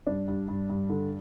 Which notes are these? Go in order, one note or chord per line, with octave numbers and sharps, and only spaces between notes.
G2 D4
G2
G2
G2
D3